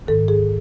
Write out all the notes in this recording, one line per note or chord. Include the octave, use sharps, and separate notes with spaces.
G#2 D#3 A4
G#4